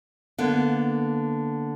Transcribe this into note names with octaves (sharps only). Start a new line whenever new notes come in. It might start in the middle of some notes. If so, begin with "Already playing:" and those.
D3 A#3 B3